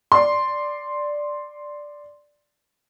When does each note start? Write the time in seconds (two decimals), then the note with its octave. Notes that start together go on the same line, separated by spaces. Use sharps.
0.12 D5 C6